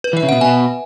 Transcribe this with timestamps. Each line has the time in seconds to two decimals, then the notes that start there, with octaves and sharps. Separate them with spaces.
0.04 B4
0.13 E3
0.17 E5
0.23 C#3
0.29 B2 F#5
0.41 B2 G#5